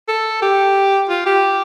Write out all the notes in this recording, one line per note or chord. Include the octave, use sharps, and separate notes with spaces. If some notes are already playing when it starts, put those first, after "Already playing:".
A4
G4
F4
G4